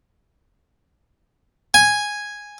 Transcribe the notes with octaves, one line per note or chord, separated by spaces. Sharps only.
G#5